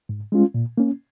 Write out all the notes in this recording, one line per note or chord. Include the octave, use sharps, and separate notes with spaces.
G#2
G#3 C#4 F4
A#2
A#3 C#4